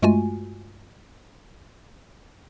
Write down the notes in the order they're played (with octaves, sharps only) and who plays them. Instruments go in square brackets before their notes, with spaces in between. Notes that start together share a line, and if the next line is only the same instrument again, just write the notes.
[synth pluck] G2 G#3 A3 F4 F#4 G#5